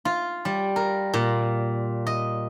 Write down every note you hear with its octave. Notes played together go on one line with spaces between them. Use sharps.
F4
G3
A#4
A#2
D#5